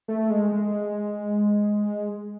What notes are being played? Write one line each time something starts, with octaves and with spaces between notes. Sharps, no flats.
A3
G#3
G#3